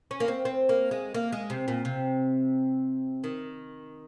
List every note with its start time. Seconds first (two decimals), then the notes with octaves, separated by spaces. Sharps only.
0.11 C#4
0.20 A#3
0.28 C4
0.45 C4
0.69 A#3
0.91 G#3
1.15 A#3
1.32 G#3
1.50 C3
1.68 A#2
1.85 C3
3.24 D#3